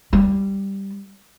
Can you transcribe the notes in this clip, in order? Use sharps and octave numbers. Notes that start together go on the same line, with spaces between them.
G3